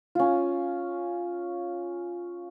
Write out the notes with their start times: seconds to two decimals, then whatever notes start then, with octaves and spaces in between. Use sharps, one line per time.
0.15 C#4 F4